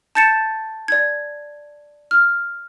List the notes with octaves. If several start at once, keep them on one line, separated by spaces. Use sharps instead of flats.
A5 G6 A6 C#7 E7
D5 G#6
F6